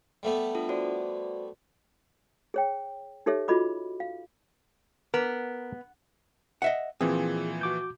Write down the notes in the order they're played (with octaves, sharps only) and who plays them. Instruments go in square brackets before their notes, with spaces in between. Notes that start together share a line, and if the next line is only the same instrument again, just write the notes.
[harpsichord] G3 A3 B3
[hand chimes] D4 F4 A4
F#4 C5 D5
[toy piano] G#4 C#5 G5
D#4 G4 A4 C#5 E5
F4 F#4 A4 D#5 B5 D6
F5
[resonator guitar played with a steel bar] B3 [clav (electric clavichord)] A#4
[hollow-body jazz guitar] D#5 E5 F#5
[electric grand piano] A#2 E3 F3 [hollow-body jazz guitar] C4 [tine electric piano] G#4
[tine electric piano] F#4 D6 G6